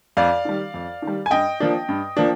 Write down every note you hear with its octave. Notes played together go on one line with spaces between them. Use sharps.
F2 D5 F5
D#3 G3
F2
D#3 G3
G#5
G2 D#5 G5
F3 A#3 D4
G2
F3 A#3 D4